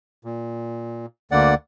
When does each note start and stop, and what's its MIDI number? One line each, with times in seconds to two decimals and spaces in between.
0.24 1.06 46
1.31 1.54 38
1.31 1.54 50
1.31 1.54 58
1.31 1.54 74
1.31 1.54 78